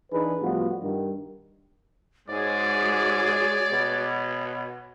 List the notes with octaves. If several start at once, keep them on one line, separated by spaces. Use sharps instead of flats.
E3 D4 D#4 G#4 B4
A2 F3 G3 B3 F4 F#4
G2 D#3 G3
G#2 G#3 F#4 G#4 C#5 D5
B2